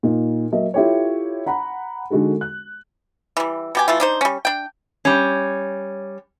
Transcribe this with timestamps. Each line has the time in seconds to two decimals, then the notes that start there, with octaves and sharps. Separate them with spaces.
0.03 A#2 D#4
0.52 F#3 A#3 D#5 E5
0.74 E4 F4 G4 A4 C#5
1.46 F#5 A#5 B5
2.10 D3 G#3 D#4 F#4 A4
2.41 F#6
3.37 E3 G3
3.75 B2 G4 G#5
3.88 E3 A3 F4
4.00 D4 D#4 C5
4.21 G3 C#4
4.45 D4 G5
5.05 G3 C#4